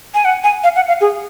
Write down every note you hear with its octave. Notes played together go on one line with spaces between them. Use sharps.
G#5
F#5
G#5
F5
F#5
F5
G#4